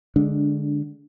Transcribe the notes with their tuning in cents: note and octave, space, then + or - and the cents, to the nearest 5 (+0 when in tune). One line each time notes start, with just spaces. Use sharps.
D3 +0 G#3 +0 D4 -20